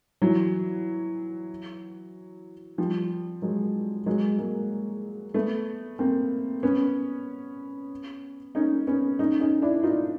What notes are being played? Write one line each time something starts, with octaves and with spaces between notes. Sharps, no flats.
E3 F#3
F3 G3
F#3 G#3
F#3 G#3
G#3 A#3
A3 B3
A#3 C4
B3 C#4
C#4 D#4
B3 C#4
C#4 D#4
C#4 D#4
D4 E4
D#4 F4